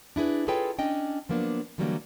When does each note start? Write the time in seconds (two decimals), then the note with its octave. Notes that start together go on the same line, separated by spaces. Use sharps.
0.16 D4 E4 G#4 B4
0.48 F4 G#4 A4 B4 C#5 G5
0.79 C#4 D4 D#5 G5
1.29 F3 F#3 A#3 B3 D4
1.78 D3 E3 F#3 G3 A3 A#3